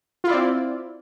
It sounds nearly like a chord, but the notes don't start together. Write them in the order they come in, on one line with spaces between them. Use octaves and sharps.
F4 E4 D5 C4